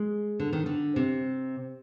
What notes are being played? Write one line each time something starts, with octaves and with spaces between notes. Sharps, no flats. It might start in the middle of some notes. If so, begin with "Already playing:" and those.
Already playing: G#3
D3
D#3
D3
C3